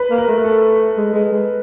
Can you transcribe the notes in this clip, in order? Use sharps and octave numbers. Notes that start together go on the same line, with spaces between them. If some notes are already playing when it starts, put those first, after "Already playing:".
Already playing: B4
A#3
A#4
A3
A#4
A4
G#3
G#3
G#3